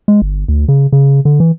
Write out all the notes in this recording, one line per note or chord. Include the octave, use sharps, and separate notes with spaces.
G#3
G1
D2
C#3
C#3
D3
E3